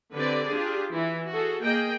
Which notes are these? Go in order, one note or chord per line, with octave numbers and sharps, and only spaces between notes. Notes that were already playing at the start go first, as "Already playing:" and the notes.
D3 C4 G4 B4 D5
D4 F4 G4 G#4
E3 E4
F#4 G#4 A4
A#3 G#4 D#5 G5